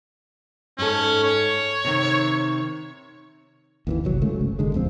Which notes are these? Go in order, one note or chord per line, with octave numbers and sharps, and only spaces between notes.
G#2 C#4 A4
C#5
C3 D#3
D#2 D#3 E3
G1 C2 F#3
C#3 G#3 A3
F#1
A1 D3 G#3
D#1 F2 C4